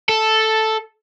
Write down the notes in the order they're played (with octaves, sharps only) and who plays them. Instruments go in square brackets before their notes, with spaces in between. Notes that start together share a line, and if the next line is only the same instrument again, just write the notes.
[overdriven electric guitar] A4